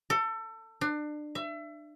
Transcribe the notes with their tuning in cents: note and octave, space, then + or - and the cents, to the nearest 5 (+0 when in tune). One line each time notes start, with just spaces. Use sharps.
A4 +25
D4 +30
E5 +30